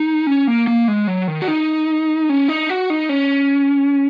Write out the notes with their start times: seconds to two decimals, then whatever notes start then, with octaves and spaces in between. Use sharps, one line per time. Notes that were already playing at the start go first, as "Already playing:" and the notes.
Already playing: D#4
0.27 C#4
0.47 A#3
0.67 A#3
0.88 G#3
1.07 F#3
1.28 D#3
1.42 F#4
1.48 D#4
2.29 C#4
2.48 D#4
2.69 F#4
2.90 D#4
3.09 C#4